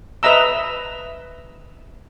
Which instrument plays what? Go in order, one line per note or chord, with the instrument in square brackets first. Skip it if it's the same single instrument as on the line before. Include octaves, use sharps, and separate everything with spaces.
[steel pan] B4 D#5 E5 A#5 E6